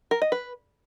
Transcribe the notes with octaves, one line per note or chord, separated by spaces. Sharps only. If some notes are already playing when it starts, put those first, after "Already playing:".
A#4
D#5
B4